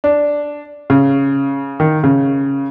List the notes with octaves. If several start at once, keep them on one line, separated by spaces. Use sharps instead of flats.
D4
C#3
D#3
C#3